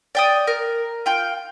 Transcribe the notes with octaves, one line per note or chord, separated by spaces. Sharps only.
D5 G5 D#6
A#4
F4 G5